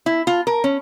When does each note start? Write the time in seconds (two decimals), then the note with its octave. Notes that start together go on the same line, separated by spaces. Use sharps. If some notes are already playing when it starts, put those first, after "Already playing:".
0.06 E4
0.27 F4
0.47 A#4
0.64 C#4